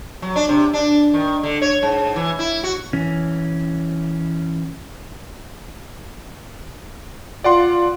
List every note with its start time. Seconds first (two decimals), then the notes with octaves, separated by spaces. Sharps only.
0.22 F#3
0.36 D4
0.49 C3
0.73 D4
1.14 D#3
1.43 D3
1.62 C#5
1.83 G#2
2.16 E3
2.39 E4
2.63 F#4
2.93 E3 C#4
7.44 F4 D5 F#5 C6